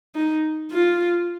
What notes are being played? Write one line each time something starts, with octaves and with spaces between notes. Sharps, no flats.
D#4
F4